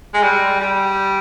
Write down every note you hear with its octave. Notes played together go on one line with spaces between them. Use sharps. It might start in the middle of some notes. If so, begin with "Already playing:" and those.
G#3
G3
G3